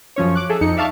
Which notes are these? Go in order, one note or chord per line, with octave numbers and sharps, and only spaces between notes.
F#2 F3 C#4 C#5
D6 F#6
G#4 A4 E5
F2 D#4 C#7
D5 E5 F5 A5 C#6